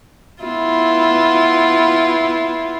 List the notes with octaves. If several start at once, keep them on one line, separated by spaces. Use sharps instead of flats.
B3 E4 F4